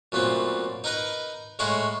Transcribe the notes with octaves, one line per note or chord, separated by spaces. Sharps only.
F#2 A#2 A3 B3 C4
D#4 A#4 B4 A#5
A2 G#3 E4 C#5 F5 F#5